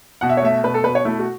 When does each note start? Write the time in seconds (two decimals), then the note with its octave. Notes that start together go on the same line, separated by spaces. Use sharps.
0.21 B2 F#5
0.29 E5
0.37 C#5
0.42 A3 E5
0.63 B2 B4
0.74 A4
0.84 B2 B4
0.95 C#5
1.05 A3 E4
1.19 F#4